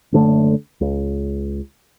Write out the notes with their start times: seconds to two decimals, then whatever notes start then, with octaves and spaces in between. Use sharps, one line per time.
0.12 F#1 D3 A3
0.81 C#2